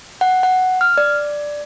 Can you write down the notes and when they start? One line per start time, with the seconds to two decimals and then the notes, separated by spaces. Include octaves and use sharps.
0.21 F#5
0.43 F#5
0.81 F6
0.98 D5